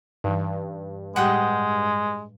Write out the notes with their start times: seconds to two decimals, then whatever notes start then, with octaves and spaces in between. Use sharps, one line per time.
0.24 G2 E3 D#4
1.16 A2 G3 G#3 G4 F#5 G5 D#6